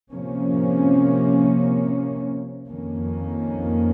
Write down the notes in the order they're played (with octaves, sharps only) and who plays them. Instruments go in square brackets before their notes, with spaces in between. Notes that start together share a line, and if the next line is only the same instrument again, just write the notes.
[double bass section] C3 F3 A#3 C#4
F2 D#3 A#3 C#4